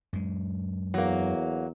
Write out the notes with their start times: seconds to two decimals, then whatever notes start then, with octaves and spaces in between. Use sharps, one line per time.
0.13 F#2 G#3
0.94 E2 F#3 A#3